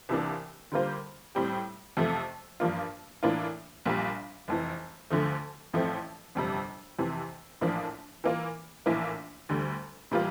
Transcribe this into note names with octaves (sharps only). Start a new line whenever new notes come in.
C2 C3 E3 A#3 D4
D3 G3 A#3 F4 C5
A2 G3 C4 G4
F2 C3 F3 A3
G2 F3 A#3 D4 F4
A2 E3 A#3 D4 F4
A#1 A#2 G3
F1 F2 E3
D2 D3 F3 A3
A1 A2 F3 A3 C4
G1 F2 C3 G3
F2 C3 E3
A#1 A2 F3 A#3 D4
E3 A#3 F4
A#1 A2 E3 A#3 E4
D2 D3 G3
A2 E3 G3 A#3 F4